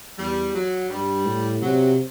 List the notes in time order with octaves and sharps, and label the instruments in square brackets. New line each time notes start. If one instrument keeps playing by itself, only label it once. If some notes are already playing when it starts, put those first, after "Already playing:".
[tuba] E2 [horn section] G3
[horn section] F#3
[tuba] G2 [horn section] G3
[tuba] A2
[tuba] C3 [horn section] F#3